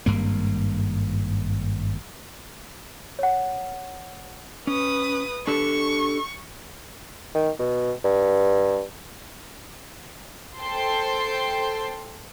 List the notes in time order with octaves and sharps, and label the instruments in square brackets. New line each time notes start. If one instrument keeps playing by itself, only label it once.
[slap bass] G#1 G2 A#3
[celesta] C#5 F#5
[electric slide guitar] C#4 [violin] B4 D#6
[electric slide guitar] D4 G4 A4 [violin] C#6
[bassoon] D#3
B2
G2
[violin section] A4 C5 G5 A5 C6